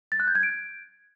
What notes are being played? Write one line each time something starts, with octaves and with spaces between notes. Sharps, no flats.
A6
F#6
G6
G#6
D7